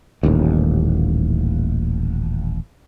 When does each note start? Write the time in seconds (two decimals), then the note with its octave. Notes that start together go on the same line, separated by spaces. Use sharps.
0.23 D#1 A1 D#2